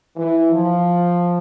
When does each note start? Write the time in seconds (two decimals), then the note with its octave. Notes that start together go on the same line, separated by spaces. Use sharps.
0.16 E3
0.52 F3